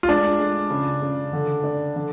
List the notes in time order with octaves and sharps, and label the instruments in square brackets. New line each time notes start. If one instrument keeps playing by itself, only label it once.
[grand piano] F4
[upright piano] G#3 [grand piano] D4
[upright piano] G#3
C#3
C#3
D3
D4
D3